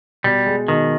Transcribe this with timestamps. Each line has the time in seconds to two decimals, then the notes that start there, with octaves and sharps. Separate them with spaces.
0.24 B2 G3
0.46 G#3
0.68 B2 D#3